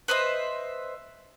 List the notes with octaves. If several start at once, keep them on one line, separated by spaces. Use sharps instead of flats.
B4 C5 D#5 E5